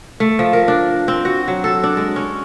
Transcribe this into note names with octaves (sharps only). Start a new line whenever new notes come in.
A3
F3
A#4
D4
C4
F#4
F#3
A4
D4
G#3
C#4